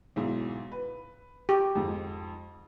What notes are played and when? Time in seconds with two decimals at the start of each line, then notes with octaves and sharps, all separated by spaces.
0.16 B1 G#2 E4
0.72 B4
1.49 G4
1.75 F2 G#2